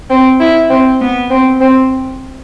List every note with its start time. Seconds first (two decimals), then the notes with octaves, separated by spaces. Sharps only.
0.10 C4
0.40 E4
0.69 C4
1.00 B3
1.30 C4
1.60 C4